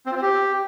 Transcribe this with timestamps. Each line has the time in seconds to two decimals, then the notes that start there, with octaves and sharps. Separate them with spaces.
0.06 C4
0.12 F4
0.17 C4
0.22 G4